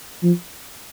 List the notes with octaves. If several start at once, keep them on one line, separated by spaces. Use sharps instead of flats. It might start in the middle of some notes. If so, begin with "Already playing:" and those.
F3